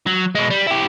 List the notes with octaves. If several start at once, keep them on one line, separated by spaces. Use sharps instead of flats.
F#3
B2 G#3
G3
E4 G4